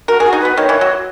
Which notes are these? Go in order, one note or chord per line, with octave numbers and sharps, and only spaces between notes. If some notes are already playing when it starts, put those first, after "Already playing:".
F#4 A#4
G#4
F#4
D#4
B3 B4
D#3 C#5
E3
F#3